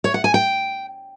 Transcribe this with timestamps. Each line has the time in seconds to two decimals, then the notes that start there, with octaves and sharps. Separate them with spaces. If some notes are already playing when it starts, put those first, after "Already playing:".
0.04 C#5
0.14 F#5
0.24 G#5
0.34 G5